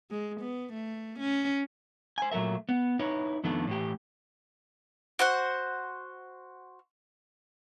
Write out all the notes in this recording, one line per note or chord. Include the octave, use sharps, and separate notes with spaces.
G#3
B3
A3
C#4
C5 G#5
A#2 F#3 A3 A#4 E5
B3
D#4 E4 B4 C#5
F2 D#3 A3 B3 D4
A2 E3 G4
F#4 C5 F#5